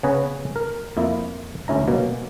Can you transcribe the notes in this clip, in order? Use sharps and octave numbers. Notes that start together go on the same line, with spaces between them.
C#3 B3 G#4 B4 C#5 A#5
A#4
F2 A#3 E4
D2 C#4 E4 A#5
B2 F#3 A#3